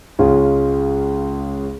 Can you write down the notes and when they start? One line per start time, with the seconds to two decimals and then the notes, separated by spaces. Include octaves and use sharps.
0.19 C#2 C#3 G#3 C#4 F4